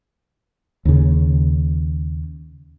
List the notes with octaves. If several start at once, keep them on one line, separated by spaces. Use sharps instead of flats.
D#2 C#3